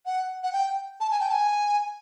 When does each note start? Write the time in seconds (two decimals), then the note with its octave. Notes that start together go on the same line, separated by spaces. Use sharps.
0.06 F#5
0.43 F#5
0.52 G5
1.00 A5
1.11 G#5
1.20 G5
1.29 A5
1.33 G#5